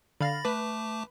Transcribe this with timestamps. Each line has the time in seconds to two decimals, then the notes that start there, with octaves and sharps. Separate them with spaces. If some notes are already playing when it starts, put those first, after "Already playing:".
0.21 D3 F5 B5 A6 A#6
0.45 A3 B4 A5 D6